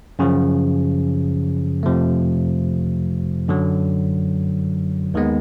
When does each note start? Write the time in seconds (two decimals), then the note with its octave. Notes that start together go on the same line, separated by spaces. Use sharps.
0.19 F#2 C#3 F3
1.83 F2 C3 F3 A3
3.48 F#2 D3 F#3
5.14 D#2 D#3 G#3 B3